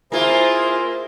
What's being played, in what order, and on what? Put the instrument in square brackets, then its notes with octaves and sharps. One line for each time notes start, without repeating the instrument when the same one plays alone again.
[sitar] A#3 F4 [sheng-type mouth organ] E4 G#4 [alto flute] C5